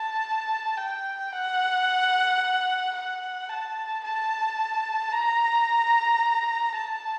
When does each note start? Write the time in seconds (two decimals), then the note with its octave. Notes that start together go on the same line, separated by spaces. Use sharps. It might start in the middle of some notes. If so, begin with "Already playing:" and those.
Already playing: A5
0.77 G5
1.32 F#5
2.95 F#5
3.49 A5
4.04 A5
5.13 A#5
6.76 A5